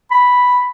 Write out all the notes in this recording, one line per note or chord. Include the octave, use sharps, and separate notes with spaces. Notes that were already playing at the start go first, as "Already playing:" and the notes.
B5